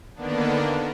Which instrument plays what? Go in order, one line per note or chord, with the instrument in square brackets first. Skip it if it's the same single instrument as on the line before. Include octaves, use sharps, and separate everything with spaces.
[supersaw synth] D3 D#3 A#3 B3 D4